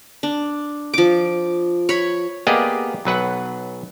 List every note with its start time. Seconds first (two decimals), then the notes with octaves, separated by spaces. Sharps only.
0.23 D4
0.94 F3 D6
1.89 C#5 B5
2.47 A#3 B3 G4 G#4 D5 D#5
3.05 B1 F#3 B4 F#5